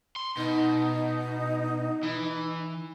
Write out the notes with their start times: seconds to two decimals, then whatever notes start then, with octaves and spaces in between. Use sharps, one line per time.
0.16 C6
0.37 B2 D#4
2.03 E3